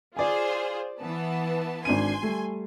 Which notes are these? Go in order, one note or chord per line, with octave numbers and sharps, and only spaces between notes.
F4 G#4 C5 D5 G#5
E3 B3 A5
G#1 D4 G#5 C6 D#7
G3 A3